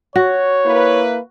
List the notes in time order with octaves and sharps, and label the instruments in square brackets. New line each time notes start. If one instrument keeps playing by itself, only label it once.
[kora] F#4 [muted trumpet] C#5
[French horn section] A#3 E4 B4